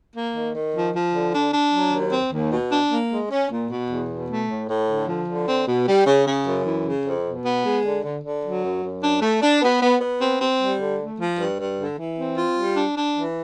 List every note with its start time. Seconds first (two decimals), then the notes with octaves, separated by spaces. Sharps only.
0.15 A#3
0.34 D#3
0.54 D#3
0.73 F3
0.94 F3
1.13 D3
1.33 D4
1.53 D4
1.72 F#3
1.92 D#2
2.11 C4
2.32 D#2
2.51 B2
2.71 D4
2.91 A#3
3.10 G#3
3.30 C#4
3.50 A#2
3.69 B2
3.89 E2
4.09 B2
4.28 A3
4.49 A2
4.68 A2
4.88 D3
5.08 F3
5.27 D3
5.47 C4
5.67 B2
5.86 G3
6.06 C#3
6.26 C#3
6.46 F#2
6.65 E3
6.85 C#3
7.04 F2
7.25 B2
7.44 B3
7.63 G#3
7.83 D3
8.03 D3
8.23 D3
8.43 F#3
8.63 F#2
8.82 F#2
9.02 D4
9.21 A3
9.41 D4
9.61 B3
9.81 B3
10.00 B3
10.20 C4
10.39 C4
10.60 G3
10.79 D3
10.98 A3
11.19 F3
11.38 G2
11.58 G2
11.78 D3
11.97 E3
12.17 C4
12.37 F4
12.57 G3
12.76 D4
12.96 D4
13.16 E3